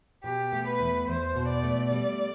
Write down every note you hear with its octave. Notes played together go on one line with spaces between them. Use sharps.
B2 G4
A3
B4
E2
E2 C5
B2
D5
A3
G3